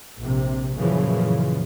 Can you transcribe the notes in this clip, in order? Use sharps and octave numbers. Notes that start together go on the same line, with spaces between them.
A#1 C3
F#2 A#2 C#3 E3 F3